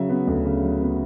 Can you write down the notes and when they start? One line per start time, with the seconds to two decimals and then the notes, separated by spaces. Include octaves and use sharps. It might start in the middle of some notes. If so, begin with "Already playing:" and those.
Already playing: C#3 F#3 E5
0.10 B3
0.27 D2
0.46 C#3
0.63 F#3
0.81 B3